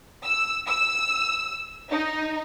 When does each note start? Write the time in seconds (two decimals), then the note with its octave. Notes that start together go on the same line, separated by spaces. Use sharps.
0.24 E6
0.67 E6
1.89 D#4